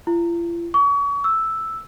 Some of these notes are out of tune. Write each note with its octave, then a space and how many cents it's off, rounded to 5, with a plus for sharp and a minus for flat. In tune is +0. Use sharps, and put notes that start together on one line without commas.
F4 -45
C#6 +35
E6 +0